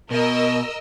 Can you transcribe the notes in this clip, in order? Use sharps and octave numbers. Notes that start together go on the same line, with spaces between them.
B2 A#4 D#5 E6